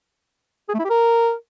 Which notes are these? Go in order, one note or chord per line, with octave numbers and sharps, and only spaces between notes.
G#4
A3
E4
G4
A#4